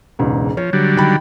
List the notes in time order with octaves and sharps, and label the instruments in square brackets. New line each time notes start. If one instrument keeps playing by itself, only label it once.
[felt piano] E1 C#2 G#2
[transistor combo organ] F3 [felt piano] C#5
[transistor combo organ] D3 F#3 G3
[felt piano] D#3 G5 B5